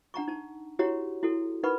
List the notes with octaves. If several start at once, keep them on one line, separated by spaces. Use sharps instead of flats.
D4 F#5 A#5 C#6
D#4 A5
E4 F#4 G4 C#5 F#5 A#5
E4 F#4 A4
D#4 A#4 B4 F#5 B5 C#6